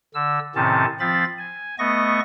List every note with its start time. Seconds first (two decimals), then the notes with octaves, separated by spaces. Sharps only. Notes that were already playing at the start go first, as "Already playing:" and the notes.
0.15 D3 E6
0.56 A2 C3 D#3 C4 C#4 A5
1.00 F3 C4 F4 B5 A6
1.38 G#5
1.79 A3 B3 D#5 C#6 A#6